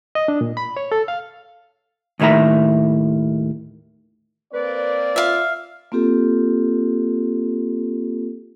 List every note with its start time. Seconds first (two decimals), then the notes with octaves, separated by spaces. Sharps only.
0.15 D#5
0.28 D4
0.41 A#2
0.57 B5
0.77 C#5
0.92 A4
1.08 F5
2.20 D#2 A2 D#3 E5 A#5
4.53 A#3 C4 B4 D5
5.16 F4 E5 F5
5.92 A#3 C4 F4 G4 A4